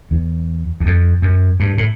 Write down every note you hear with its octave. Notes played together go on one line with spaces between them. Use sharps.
E2
E2
F2
F#2
G2
A2